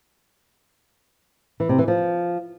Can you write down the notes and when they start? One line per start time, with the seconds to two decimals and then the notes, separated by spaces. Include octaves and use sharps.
1.60 E3
1.69 C3
1.78 E3
1.88 F3